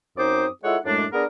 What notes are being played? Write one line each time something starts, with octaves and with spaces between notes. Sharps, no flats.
F#2 C4 D#4 C5 D6 D#6
G#3 E4 F4 A4 C#5 F#5
F#2 A2 G#3 A3 D4
B3 D4 G#4 A#4